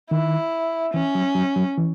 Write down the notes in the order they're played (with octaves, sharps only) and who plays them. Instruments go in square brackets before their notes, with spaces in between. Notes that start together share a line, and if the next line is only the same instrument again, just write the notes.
[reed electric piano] D#3 [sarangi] E4
[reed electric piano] E3 [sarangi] C#4
[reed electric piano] F#3
F#3
F#3
E3